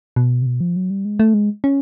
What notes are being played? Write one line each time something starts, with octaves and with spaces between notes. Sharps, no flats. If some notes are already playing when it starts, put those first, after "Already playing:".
B2
C3
B2
F3
F#3
G3
G#3
A3
G#3
C#4